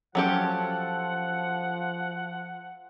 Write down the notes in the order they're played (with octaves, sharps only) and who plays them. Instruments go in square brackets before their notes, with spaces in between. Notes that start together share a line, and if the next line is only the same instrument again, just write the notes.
[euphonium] F3 [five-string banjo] F#3 C#4 G4 [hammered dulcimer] F4 A4 [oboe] F#5